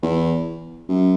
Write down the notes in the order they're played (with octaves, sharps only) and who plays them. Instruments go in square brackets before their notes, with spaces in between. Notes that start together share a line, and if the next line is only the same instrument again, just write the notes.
[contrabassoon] E2
F#2